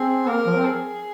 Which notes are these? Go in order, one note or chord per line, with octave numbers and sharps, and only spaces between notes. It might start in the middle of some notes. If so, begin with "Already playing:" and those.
Already playing: C4 G#4
A#3 A#4
F3
C4
G#4